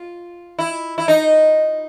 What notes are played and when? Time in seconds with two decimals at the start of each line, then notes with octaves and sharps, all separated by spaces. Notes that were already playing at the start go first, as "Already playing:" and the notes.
Already playing: F4
0.59 E4
0.98 E4
1.08 D#4